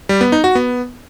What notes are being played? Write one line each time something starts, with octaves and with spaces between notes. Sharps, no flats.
G3
B3
D#4
F#4
B3